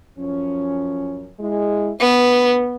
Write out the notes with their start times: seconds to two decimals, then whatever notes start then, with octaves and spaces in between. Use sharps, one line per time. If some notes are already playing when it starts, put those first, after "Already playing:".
0.19 F#2 F3 C#4
1.40 G#3 E4
2.00 D2 B3 B4